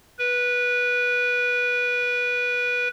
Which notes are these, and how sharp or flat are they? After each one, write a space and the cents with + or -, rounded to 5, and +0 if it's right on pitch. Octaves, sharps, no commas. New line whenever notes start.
B4 -15